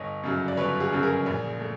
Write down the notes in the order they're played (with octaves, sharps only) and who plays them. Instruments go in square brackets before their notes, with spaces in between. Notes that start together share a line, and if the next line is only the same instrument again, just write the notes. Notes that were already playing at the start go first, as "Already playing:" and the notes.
Already playing: [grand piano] G1 C#5 D#5
F#2 C#3 F#3
D5
G1 B4 C#5
F#4 G#4
F#2 C#3 F#3
G#4 A#4
A#1
A3